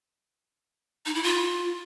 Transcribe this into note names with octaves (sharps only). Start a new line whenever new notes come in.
D#4
E4
F4